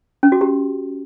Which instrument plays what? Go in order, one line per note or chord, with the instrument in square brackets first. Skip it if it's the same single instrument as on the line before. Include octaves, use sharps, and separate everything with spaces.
[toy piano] C#4
F#4
G4